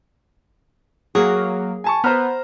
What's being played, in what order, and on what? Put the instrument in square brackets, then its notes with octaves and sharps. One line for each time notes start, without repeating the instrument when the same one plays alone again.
[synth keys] F#3 A#3 [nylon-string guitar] G#4
[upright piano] G#5 A5 C#6
[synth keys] B3 [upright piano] C5 A#5 F6